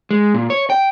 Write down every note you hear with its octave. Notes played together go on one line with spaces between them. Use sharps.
G#3
A#2
C#5
G5